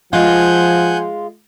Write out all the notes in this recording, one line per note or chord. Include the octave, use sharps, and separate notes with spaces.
F3 G#3 F4 F#5 G#5 G6